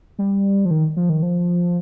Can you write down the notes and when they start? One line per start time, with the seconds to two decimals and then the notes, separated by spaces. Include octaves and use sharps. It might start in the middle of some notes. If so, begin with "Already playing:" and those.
0.19 G3
0.65 F3
0.71 D#3
0.97 F3
1.10 D#3
1.23 F3